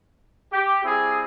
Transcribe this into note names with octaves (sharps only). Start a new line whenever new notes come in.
G4
G3 C4 E4 G4 G#4